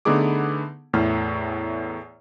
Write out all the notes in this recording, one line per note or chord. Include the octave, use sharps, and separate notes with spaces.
D3 A3 B3 D#4 G#4 D6
E2 A2 A3 F6